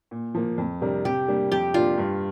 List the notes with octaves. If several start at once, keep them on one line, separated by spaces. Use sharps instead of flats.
A#2
F3 A#3
F2
C3 G3 D4 A#4
C3 G4
G3 A#3 D4
F2 G4
C3 A#3 D4 F4
G2